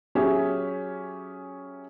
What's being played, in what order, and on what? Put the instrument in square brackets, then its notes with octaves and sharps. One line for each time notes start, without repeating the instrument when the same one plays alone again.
[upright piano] F#3 C#4 G4 G#4 E5